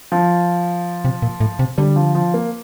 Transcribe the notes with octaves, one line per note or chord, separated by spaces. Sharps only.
F3
C3
A#2
A2
C3
D3 G3
F3
F3
A#3